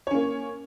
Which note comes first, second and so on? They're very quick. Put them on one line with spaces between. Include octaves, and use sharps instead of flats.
C#5 C#4 A#3